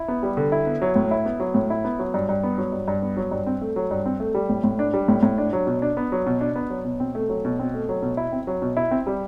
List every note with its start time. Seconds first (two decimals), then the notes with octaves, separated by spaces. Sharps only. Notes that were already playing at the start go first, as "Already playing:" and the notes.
Already playing: E4
0.08 B3
0.23 G3
0.37 D3
0.52 E4
0.67 B3
0.82 F#3
0.96 A2
1.11 E4
1.26 B3
1.40 F#3
1.54 A2
1.70 E4
1.84 B3
1.99 F#3
2.14 G2
2.29 G2
2.43 B3
2.58 F#3
2.72 G2
2.88 G2
3.02 B3
3.17 F#3
3.31 G2
3.46 C4
3.61 A3
3.76 F#3
3.91 G2
4.06 C4
4.20 A3
4.35 G3
4.49 A2
4.64 A2
4.79 D4
4.94 G3
5.08 A2
5.23 A2
5.38 D4
5.53 F#3
5.67 B2
5.82 D4
5.97 B3
6.12 F#3
6.26 B2
6.41 D4
6.56 B3
6.70 F#3
6.85 B2
7.00 C4
7.15 A3
7.29 F#3
7.45 B2
7.59 C4
7.74 A3
7.89 F#3
8.02 B2
8.17 E4
8.32 C4
8.47 F#3
8.62 B2
8.77 E4
8.91 C4
9.07 G3